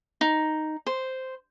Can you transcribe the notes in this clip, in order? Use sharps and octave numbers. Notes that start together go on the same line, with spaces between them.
D#4
C5